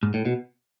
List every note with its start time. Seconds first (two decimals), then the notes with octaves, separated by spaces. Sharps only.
0.03 G#2
0.14 A2
0.25 B2